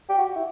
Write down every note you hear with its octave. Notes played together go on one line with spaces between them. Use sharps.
G4
F#4
E4